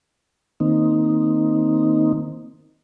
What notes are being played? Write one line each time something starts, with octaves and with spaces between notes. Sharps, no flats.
D#3 A#3 C4 D#4